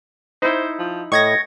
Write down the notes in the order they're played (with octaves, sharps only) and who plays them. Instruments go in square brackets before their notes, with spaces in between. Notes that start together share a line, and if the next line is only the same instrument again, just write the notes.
[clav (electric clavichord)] D#4 E4 [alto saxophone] C5
[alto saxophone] F3
[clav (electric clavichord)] A2 [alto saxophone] D#5 [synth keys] C#6 G#6 A#6